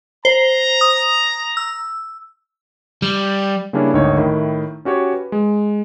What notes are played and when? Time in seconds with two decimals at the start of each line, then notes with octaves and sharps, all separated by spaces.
0.25 C5 A#5
0.81 D#6
1.57 E6
3.02 G3
3.73 C#3 G3 A#3 C#4 D4 E4
3.93 G#1 D2 D#3 D#4 C#5
4.17 A2 D#3 E4
4.85 C#4 F#4 G4 C#5
5.13 B4
5.32 G#3